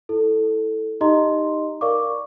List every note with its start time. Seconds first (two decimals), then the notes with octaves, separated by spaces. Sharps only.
0.09 E4 A4
1.01 D#4 G4 D#5 A#5 C6
1.81 A#4 D5 F5 C#6 D6